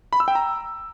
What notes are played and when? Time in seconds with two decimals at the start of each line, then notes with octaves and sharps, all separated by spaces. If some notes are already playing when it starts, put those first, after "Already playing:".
0.13 B5
0.20 E6
0.28 G5
0.35 A#5